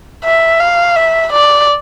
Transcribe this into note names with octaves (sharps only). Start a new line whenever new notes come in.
E5
F5
E5
D5